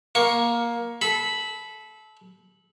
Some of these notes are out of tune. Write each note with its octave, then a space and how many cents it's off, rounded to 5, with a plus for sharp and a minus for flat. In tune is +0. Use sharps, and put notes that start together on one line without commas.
A#3 +15 C#6 +0
A4 -25 B5 +0